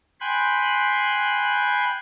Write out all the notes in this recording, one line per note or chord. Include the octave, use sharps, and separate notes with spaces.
G5 G#5 B5 C6 F#6